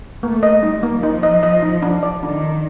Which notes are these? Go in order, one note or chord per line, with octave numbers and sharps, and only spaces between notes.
A3 A#3
D#5
G3 D#4
A#3
F3 D#4
D#5
D#5
D#4
D4
D5
D#3 D4
D4